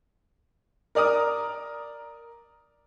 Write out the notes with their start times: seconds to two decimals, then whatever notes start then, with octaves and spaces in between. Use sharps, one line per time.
0.95 A#4 D5 A#5 D#6 F6